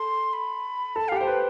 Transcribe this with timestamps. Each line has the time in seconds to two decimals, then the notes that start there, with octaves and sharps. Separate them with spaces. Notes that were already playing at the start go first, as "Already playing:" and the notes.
Already playing: A4 C6
0.33 B5
0.96 A4 A5
1.09 F5
1.12 G4
1.17 C5 G5
1.27 B4